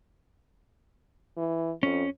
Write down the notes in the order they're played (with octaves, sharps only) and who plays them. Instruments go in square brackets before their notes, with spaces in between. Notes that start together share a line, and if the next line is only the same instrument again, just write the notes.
[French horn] E3
[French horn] F2 [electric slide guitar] C#4